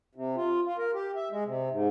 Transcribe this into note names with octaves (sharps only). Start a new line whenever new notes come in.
C3
F4
F4
A#4
G4
E5
G#3
C3
G#2